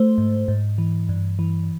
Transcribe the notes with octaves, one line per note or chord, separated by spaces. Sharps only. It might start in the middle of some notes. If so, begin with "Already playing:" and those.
Already playing: A3 C5
G#2
G#2
E3
G2
E3